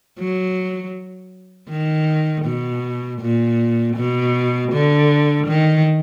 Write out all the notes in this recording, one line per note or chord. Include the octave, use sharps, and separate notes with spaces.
F#3
D#3
B2
A#2
B2
D3
D#3